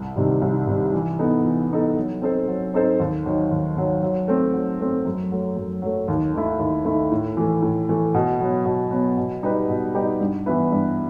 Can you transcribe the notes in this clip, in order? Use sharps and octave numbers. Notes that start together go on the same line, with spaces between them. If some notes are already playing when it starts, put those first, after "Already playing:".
Already playing: C2
C3 D#3 G3
C2
C3 D#3 G3
E3
B3 D#4 A4
E3
B3 D#4 A4
F#3
C4 D#4 A4 C5
F#3
C4 D#4 A4 C5
D#2
D#3 F#3
D#2
D#3 F#3
F#3
A3 C4
F#3
A3 C4
F#2
F#3 A3
F#2
F#3 A3
D#2
D#3 A3 E4
D#2
D#3 A3 E4
A2
E3 A3
A2
E3 A3
B2
F#3 B3
B2
F#3 B3
B2
G3 D#4 G4 B4
B2
G3 D#4 G4 B4
G2
E3 B3 E4 B4
G2